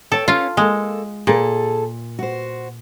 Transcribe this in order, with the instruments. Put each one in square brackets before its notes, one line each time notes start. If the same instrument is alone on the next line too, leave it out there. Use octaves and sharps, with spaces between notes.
[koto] A4 [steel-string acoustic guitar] C#5 G5 A5
[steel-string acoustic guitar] C#4 C#5 F5 [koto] F4
[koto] G#3 [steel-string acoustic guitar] A#3 A4
[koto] A#2 [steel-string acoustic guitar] G#4 A4
[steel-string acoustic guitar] F#4 C5